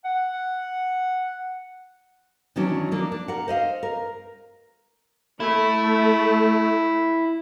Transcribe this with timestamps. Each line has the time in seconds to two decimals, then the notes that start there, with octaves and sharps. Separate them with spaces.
0.05 F#5
2.56 D#3 E3 F#3 C#4 D4 E4
2.92 F3 A#3 D4 F4
3.12 D4
3.28 A#4 F#5
3.48 C5 D#5 F5
3.83 A#4
5.40 A3 E4